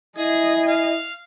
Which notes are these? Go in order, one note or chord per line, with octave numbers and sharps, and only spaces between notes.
E4 G#4 D#5 G#5
F5